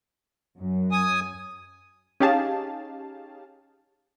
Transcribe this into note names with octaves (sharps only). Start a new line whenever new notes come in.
F#2
G#5 D#6
C#4 D#4 G4 G#4 F5 A5